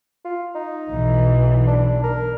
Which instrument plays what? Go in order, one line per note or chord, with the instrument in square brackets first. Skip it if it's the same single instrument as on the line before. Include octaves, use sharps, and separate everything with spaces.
[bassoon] F4
D#4
[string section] B1 E3
[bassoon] D4
A#4